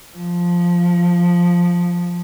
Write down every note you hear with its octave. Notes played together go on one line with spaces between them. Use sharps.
F3